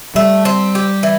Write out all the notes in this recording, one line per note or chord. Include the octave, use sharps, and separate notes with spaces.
G3 A3
C4
G4
E3